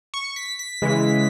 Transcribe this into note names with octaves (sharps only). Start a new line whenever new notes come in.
C#6
B6
B6
C#3 E3 G#3